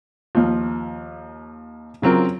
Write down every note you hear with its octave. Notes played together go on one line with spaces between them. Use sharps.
D#2 F3
C#3 F#3 C4 F4 A#4